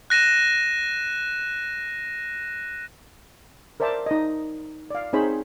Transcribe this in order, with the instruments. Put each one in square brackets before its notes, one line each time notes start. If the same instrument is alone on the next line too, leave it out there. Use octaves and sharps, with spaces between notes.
[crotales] F#6 A#6 D#7 E7
[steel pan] A#4 C5 D5 E5 A5
D#4 D#5
D5 F5
C4 D#4 G#4 C5 C#5 B5